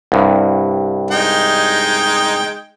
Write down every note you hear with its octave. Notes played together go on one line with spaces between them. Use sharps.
C2 G2
G#3 D#4 G5